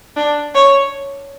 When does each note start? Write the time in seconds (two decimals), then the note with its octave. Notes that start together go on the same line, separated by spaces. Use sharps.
0.16 D4
0.55 C#5